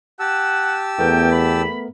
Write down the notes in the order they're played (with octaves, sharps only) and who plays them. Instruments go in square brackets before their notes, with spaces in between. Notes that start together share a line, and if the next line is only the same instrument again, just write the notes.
[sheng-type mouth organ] G4 A5 E6 [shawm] F#5
[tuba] E2 [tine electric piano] A3 B3 A#4 [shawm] G5
[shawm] B5